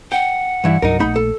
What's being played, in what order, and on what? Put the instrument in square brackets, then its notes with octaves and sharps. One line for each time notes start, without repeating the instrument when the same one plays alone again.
[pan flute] F#5 [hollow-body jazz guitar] G5
[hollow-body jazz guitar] G2 E3 E4
[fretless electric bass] C2 G2 F#3 [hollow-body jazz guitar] D#4 A#4
[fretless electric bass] A#1 A3 [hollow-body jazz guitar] D#4 B5
[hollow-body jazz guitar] A4